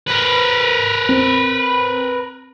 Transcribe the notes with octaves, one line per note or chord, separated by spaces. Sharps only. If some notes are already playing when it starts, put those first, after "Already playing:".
A#4 B4
C4